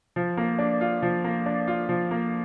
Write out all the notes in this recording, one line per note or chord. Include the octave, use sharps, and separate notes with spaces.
F3
A#3
D4
F4
F3
A#3
D4
F4
F3
A#3